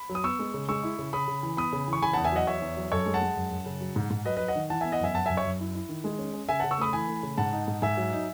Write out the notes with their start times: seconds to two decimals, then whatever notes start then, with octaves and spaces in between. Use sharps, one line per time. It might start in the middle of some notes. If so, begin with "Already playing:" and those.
Already playing: B5
0.09 F#3
0.15 D#6
0.24 B3 C#6 E6
0.39 G#3
0.54 C#3
0.68 G#3 C#6 E6
0.83 E4
0.98 C#3
1.13 C#3 B5 D#6
1.28 C#3
1.43 E3
1.57 B3 B5 D#6
1.73 C#3
1.88 E3
1.93 C#6
2.02 C#3 G#5 B5
2.13 E2 F#5 A5
2.25 E5 G#5
2.32 F#3 D#5 F#5
2.47 E2 C#5 E5
2.62 E2
2.77 F#3
2.92 F#2 A4 C#5
3.06 G#3
3.14 F#5 A5
3.21 G#3
3.36 F#2
3.51 F#2
3.66 C#3
3.81 F#3
3.96 G#2
4.10 G#2
4.25 F#3 B4 D#5
4.37 F#3 B4 D#5
4.48 D#5 F#5
4.55 D#3
4.70 E3 F#5 A5
4.81 B3 E5 G#5
4.92 D#5 F#5
5.00 F#2 E5 G#5
5.14 F#2 F#5 A5
5.26 F#2 E5 G#5
5.37 C#5 E5
5.45 F#2
5.60 E4
5.74 E4
5.89 D#3
6.04 G#3
6.19 C#4
6.33 C#4
6.49 C#3 E5 G#5
6.60 C#3 F#5 A5
6.71 C#6 E6
6.78 A3 B5 D#6
6.93 E3 G#5 B5
7.08 A3
7.23 C#3
7.37 G#2 F#5 A5
7.53 D#4
7.68 G#2
7.82 G#2 E5 G#5
7.97 F#3
8.13 D#4